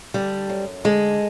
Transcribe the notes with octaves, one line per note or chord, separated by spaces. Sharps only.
D3 G3
F#2
D3 G#3